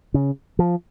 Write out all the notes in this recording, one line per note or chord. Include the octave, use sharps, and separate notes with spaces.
C#3
F3